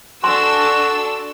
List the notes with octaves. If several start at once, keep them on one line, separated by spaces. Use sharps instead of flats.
D4 F#4 A4 G#5 C6 C#6 E6